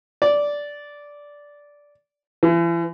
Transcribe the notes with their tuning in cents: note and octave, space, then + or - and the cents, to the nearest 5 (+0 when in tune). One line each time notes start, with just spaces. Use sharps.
D5 -10
E3 +40